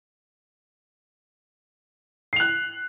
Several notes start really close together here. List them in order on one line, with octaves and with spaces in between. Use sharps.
C7 F7 F#6